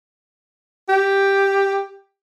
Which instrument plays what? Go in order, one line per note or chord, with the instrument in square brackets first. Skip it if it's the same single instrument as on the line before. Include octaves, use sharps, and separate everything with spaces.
[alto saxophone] G4